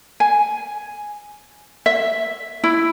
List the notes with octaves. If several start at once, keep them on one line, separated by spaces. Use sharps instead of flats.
G#5
E5
E4